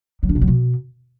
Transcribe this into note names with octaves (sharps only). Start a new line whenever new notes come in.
F#3
D4
B2
F#3
B2